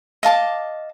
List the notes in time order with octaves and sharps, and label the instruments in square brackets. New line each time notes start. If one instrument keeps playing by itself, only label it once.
[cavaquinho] D#5 F5 A5 D6